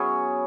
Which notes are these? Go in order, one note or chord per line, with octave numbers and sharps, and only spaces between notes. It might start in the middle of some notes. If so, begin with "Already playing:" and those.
Already playing: F#3 B3 C#4 E4 G#4 C#5